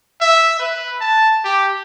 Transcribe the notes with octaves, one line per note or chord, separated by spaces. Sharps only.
E5
B4
A5
G4